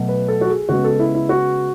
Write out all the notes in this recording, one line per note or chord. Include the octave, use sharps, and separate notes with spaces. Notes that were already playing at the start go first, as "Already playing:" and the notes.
Already playing: B2 F#3 A3
B4
A4
F#4
G#4
C#3 G#3 B3 F#4
A4
E4
E4
F#4